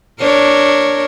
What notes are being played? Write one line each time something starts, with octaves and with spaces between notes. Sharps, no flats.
D4 A#4 C#5